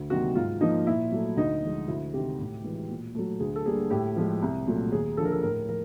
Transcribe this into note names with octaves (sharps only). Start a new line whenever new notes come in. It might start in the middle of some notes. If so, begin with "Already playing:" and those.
Already playing: D2
C3 D#3 F#3 A#3 F#4
G#2 F4
F3 A#3 D#4
A#2 E4
F#3 A3
D2 D#4
D3 F3 G#3
D2 E4
C3 D#3 G4
A2
E3 G#3
A#2
F#3 A3
D2 G#4
A4
D3 G3 A#3 G#4
A2 G4
F3 G#3
C2
A#2 F#3 A3
D#2 G#4
D3 F3 A4
A#4
A4
A2 A#4
F3 A#4